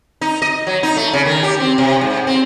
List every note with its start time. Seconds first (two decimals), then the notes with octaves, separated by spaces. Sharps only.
0.21 D#4
0.42 D#5
0.67 F#3
0.83 D#4
0.97 A3
1.13 C#3
1.26 D#3
1.43 G4
1.60 C4
1.78 C3
2.01 G#2
2.27 C4